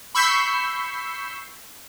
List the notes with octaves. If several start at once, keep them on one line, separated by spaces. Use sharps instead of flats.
B5 C#6 E6 G6 B6 C7